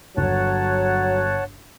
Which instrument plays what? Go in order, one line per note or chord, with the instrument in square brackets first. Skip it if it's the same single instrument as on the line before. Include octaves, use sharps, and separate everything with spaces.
[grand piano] G1 [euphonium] F#3 [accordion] C#5 F#5 A5